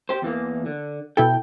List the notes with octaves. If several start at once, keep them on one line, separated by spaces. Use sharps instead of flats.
G4 C5
E2 E3 A#3
D3
B2 E4 A4 G5